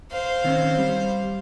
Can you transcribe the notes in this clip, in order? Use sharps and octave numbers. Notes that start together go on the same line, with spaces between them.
C5 F5
D#3 C4 C#4
G3